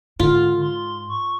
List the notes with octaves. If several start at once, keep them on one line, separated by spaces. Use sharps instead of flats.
G#2 D3 F4
C6
C#6